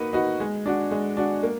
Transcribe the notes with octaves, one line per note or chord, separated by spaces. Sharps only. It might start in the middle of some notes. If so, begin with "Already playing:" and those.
Already playing: A#3 D#4 F#4 B4
D#4 F#4 B4
G#3
D4 F#4
G#3
D4 F#4
A#3